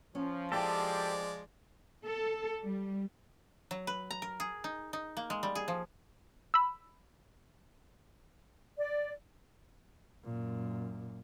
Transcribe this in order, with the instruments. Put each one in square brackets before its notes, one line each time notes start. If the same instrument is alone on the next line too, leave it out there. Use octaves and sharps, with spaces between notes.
[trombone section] F3 [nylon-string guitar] C#4
[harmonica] G#3 D5 [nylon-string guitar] C4 E4 G5 [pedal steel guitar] G4 A4
[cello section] A4
G3
[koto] F#3
B4
A#5
A#4
G#4
D#4
D#4
A#3
G#3
G3
G#4
F3
[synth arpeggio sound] B5 E6
[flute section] D5
[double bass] F#2 A#2